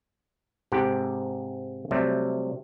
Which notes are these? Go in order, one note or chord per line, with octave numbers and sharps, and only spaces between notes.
G#2 C3 G4 A4 F#5 G5
C3 F#3 G3 A3